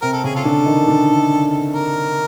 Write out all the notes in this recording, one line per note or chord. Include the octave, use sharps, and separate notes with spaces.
C3 C4 A#4
A4
C#3 C#4 G#4
F4 A4
D3 D4
D#3 D#4
D3 D4
A#4